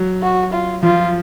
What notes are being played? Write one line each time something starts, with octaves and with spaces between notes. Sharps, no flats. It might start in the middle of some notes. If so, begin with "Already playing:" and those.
Already playing: F#3
F#4
F4
F3 F4